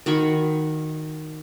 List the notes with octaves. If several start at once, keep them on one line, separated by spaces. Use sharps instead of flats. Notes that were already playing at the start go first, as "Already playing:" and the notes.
D#3 F#4 B5 C#6